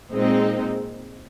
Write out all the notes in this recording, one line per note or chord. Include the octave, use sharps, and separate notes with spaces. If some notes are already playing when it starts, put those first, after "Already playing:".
A#2 G#3 C4 D#4